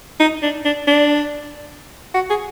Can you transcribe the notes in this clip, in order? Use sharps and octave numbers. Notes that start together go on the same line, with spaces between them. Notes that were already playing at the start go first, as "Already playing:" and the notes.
D#4
D4
D4
D4
F#4
G#4